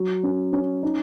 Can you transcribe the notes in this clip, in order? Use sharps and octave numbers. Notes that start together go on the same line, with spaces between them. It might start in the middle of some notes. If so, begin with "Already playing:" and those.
Already playing: F#3
C#4
C#4
D#4